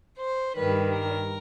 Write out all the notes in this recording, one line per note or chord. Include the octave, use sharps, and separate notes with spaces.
C5
G2 D#3 G3 B4
A#4